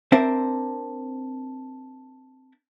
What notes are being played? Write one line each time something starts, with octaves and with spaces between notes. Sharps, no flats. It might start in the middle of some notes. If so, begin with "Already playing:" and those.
C4 D4 A#4 C5 E5